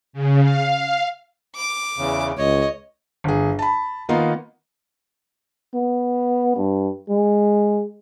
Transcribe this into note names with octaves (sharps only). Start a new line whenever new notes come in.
C#3
F5
D6
E2 C#3
C#2 C#5 D#5
G1 G#4
A5 B5
D#3 A#3 B3 D#4 F4
B3
G2
G#3